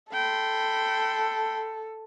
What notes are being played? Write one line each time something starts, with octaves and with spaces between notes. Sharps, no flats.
A4 G5 B5 C6